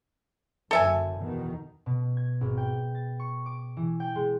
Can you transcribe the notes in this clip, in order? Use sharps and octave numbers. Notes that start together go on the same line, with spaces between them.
F#1 F#2 D3 A4 E5 G#5
E2 B2 D#3
B2
G#6
G#1
G5
A6
C#6
D6
E3
G5
G#3